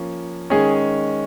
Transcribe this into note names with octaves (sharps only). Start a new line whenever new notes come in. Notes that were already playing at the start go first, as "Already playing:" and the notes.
Already playing: F3 A#3 C#4
D#3 G#3 C#4 G#4